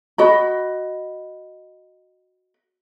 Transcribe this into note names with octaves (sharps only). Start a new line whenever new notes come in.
F#4 D#5 B5